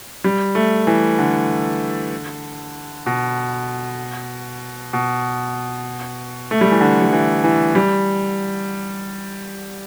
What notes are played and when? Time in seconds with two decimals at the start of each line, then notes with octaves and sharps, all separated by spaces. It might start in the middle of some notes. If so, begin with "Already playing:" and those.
0.24 G3
0.55 A3
0.87 E3
1.19 D3
3.06 B2
4.93 B2
6.51 A3
6.61 G3
6.71 E3
6.81 D3
7.02 G3
7.13 E3
7.44 E3
7.75 G3